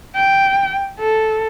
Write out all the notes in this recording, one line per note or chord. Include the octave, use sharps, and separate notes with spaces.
G5
A4